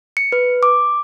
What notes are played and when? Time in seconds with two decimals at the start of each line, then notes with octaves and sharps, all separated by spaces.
0.17 C#7
0.32 B4
0.63 D6